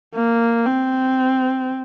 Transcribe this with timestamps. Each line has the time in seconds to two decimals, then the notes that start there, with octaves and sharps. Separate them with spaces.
0.15 A#3
0.66 C4